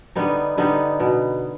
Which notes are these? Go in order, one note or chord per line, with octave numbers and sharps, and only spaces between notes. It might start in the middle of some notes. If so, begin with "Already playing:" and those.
D3 G3 B3 D#4
D3 G3 B3 D#4
B2